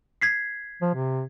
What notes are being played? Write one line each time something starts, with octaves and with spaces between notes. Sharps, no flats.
G#6 B6 C7
F3
C3